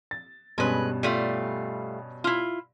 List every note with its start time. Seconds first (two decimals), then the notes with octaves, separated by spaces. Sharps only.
0.11 A6
0.58 G2 B2 G#3 C#4 B4
1.03 G3 A3 F4
2.24 E4 F4